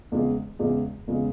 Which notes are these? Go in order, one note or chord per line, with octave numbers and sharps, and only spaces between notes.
E2 C#3 G#3
E2 C#3 G#3
E2 C#3 G#3